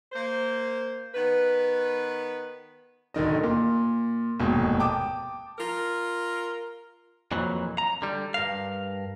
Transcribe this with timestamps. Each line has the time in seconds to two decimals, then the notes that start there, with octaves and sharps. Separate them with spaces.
0.12 A#3 C5
1.14 D#3 B3 B4
3.14 D1 D3 D#3 D#5
3.44 A#2
4.40 F1 D#2 G#2 B2
4.79 G5 A5 D6 D#6
5.59 F4 A#4
7.31 F2 A#2 E3 F#3
7.78 A#5
8.02 D3 G3
8.34 G2 A#4 F5